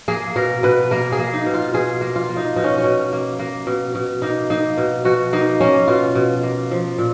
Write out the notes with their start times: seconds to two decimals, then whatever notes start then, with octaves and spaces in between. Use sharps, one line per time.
0.08 A#3 G#4
0.36 B2 A#4
0.63 B2 B4
0.91 A#3 A#4
1.12 G#4
1.19 A#3
1.33 D#4
1.46 B2
1.54 F4
1.74 B2 G#4
2.01 A#3
2.16 F4
2.29 A#3
2.37 D#4
2.56 B2 D#4
2.64 C#4
2.78 C#4
2.84 B2
3.13 A#3
3.39 A#3
3.67 B2
3.95 B2
4.22 A#3 D#4
4.50 A#3 D#4
4.78 B2
5.05 B2 F#4
5.33 A#3 D#4
5.60 A#3 C#4
5.88 B2 F4
6.15 B2
6.43 A#3
6.71 F3
6.98 A#2